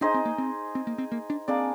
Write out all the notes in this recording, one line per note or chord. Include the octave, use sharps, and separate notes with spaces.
D4 D#4 G#4 C5 D#5
C4
A#3
C4
C4
A#3
C4
A#3
D4
A#3 C4 D4 G#4 D5